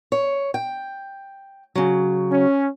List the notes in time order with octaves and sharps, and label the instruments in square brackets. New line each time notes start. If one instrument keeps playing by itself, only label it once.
[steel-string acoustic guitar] C#5
G5
C#3 F#3
[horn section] C#4